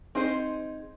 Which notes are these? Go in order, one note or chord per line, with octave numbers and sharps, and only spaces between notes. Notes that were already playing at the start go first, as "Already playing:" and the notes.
C4 D#4 G#4 C5